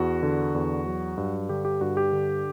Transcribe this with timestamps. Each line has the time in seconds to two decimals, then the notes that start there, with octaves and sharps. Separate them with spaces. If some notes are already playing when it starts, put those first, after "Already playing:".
Already playing: E2 F#4
0.23 D3
0.55 E2
0.86 F#3
1.18 G2
1.49 D3 G4
1.65 G4
1.81 G2 F#4
1.97 G4
2.12 D3